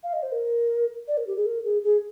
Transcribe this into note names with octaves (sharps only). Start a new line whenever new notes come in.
F5
D#5
C5
A#4
D5
A#4
G4
G#4
A#4
G#4
G#4